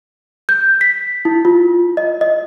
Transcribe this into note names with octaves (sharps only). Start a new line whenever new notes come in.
G6
B6
E4
F4
D#5
D#5